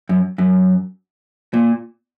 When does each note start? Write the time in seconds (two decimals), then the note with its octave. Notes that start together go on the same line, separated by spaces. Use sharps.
0.09 F#2
0.38 F#2
1.53 A#2